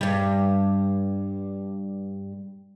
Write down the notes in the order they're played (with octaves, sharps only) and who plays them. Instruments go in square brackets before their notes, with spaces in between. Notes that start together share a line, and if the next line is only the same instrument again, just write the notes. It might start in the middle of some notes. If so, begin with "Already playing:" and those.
[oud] G2 G3